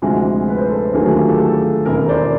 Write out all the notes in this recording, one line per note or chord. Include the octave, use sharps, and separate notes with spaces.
D2 C3 F3 G#3 F#4 G#4
B4
C5
A4 B4
D#2 D3 F#3 A3 G#4 A#4
F#4 G#4
F4 G4
G4 A4
G4 A4
E1 D#2 C#3 G#4 A#4
C5 D5